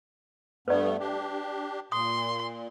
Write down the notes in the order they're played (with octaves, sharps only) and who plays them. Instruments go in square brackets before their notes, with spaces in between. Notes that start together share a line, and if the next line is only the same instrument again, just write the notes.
[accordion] G2 A3 B3 [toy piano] B4 D5
[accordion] D4 G4
[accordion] A#2 [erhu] C6 [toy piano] D#6